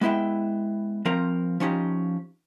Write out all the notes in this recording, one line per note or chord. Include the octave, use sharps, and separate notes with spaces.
G#3 B3 E4 E5 G5
F3 C4 A#4
F3 C#4 D#4 G4